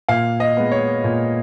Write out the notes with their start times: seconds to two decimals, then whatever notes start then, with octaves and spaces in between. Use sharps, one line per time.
0.08 A#2 F5
0.40 D#5
0.57 G#3 B3
0.71 C#5
1.04 A#2